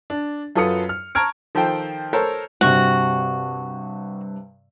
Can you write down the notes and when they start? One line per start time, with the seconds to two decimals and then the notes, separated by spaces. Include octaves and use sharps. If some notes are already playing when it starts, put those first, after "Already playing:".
0.10 D4
0.56 F#2 F4 A4 B4 D#6 C#7
0.89 F6
1.15 A5 A#5 C#6 F6 G#6 D7
1.55 D#3 F3 A4 C5 G5
2.13 A4 A#4 C5 C#5
2.61 G2 C3 F#4